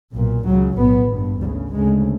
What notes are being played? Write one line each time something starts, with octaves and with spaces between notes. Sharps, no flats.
B1 A#2
C#2 C#3 F#3
B1 A2 B3
G#1 G2
D2 G3
C#3
D2 C#3 G#3